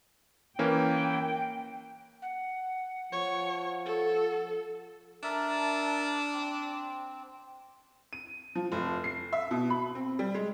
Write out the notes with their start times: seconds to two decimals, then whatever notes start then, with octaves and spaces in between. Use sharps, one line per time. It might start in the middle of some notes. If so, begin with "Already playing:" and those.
0.59 E3 A#3 C#4 G5
2.22 F#5
3.13 F3 C#5
3.85 A4
5.23 D4 A#4 E5 A5
6.33 C4
8.13 D#7
8.55 F3
8.72 F1
9.04 C7
9.33 E5
9.51 B2
9.70 B5
9.95 C4
10.19 G3
10.34 G#3